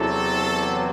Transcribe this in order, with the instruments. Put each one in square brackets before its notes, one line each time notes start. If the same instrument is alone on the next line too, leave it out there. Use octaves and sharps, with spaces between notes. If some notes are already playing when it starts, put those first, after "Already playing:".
Already playing: [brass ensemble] E2 C3 F#3 A4